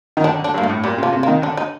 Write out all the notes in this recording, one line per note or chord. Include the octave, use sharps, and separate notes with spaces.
D#3
D3 D4
D3
D4
G2 A#3
A3
A2
A#2 G3
C3 F3
C3
A#3
D#3
D3 D4
D#4